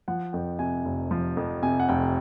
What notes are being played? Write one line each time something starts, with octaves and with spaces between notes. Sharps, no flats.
F3 F#5
F2 G5
C3 G#5
F1
F3
F2
C3 G#5
F#5
F1 G5